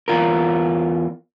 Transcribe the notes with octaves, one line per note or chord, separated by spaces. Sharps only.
E2 G2 F4 A#4